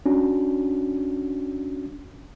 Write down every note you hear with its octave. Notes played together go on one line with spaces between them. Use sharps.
C#4 D4 F#4